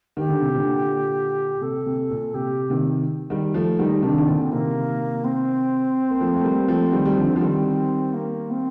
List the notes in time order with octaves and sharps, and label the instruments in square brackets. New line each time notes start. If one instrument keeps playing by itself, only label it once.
[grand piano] D#3 [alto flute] G4
[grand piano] D3
C3
A#2 D3
[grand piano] C3 [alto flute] A4
[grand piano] C3
A#2
[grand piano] C3 [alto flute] G4
[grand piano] C3 D#3
D#3 G3
F3 A3
[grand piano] D#3 G3 [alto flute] D#4
[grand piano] C3 D#3 [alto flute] D4
[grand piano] D#3
[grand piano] A#2 D3 [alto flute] C4
[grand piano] C3 D#3 [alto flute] A#3
[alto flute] C4
[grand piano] A#3
F3 A3
A3
G3 A#3
F3 A3
D#3 G3
G3
D3 F3
F3
[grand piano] D#3 G3 [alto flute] C4
[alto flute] A#3
C4